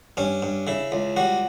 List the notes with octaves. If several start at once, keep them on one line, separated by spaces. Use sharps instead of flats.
G2 C#4
G2
C#3 E4
C#2
G3 F#4